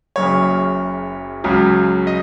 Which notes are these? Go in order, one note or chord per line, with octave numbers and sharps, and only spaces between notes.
F#1 F#2 C#3 C#5
C#2 C#3 F#3
D#5